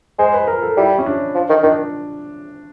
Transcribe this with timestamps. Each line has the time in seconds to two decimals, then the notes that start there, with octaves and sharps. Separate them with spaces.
0.19 G#3 C5
0.34 B4
0.48 A#4
0.62 A4
0.77 G3 E4
0.98 C#4
1.06 D4
1.35 F3
1.50 D#3
1.63 D#3 D4